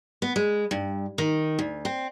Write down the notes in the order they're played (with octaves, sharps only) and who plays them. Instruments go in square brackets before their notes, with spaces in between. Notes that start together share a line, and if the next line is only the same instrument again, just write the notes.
[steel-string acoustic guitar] B3
G#3
G2
D#3
D2
C4